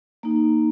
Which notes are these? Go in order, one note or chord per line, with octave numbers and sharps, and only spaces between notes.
A#3 D#4